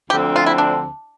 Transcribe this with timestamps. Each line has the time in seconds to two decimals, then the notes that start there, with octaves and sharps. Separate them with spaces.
0.10 D2 D3 F3 A3 C4 G4
0.36 F4
0.46 E4
0.58 D4